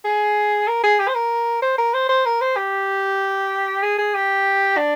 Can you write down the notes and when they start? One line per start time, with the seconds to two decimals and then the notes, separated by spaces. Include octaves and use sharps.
0.04 G#4
0.68 A#4
0.83 G#4
0.99 G4
1.08 C5
1.15 A#4
1.62 C5
1.78 A#4
1.94 C5
2.09 C5
2.25 A#4
2.41 C5
2.57 G4
3.83 G#4
3.98 G#4
4.14 G4
4.77 D4